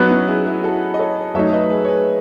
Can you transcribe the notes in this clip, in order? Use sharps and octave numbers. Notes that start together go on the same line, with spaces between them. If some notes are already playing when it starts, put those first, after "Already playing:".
Already playing: F#3 B3 D#4 F#4 B4
C#4 E4
E4 G#4
E4 G#4
F#4 A4
D#5
A4 C#5
F#3 A3 D#4 C#5 E5
B4 D#5
G#4 B4
C#5
G#4 B4